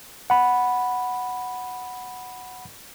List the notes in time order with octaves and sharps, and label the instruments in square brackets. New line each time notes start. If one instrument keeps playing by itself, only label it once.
[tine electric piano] F#5 B5